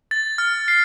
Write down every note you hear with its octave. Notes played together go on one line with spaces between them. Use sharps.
A6
F6
C7